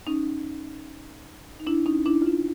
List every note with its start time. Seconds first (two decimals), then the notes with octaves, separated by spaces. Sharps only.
0.07 C#4 D#4
1.60 D#4
1.67 D4 E4
1.86 C#4 D#4
2.06 D4 E4
2.22 F4
2.26 D4 E4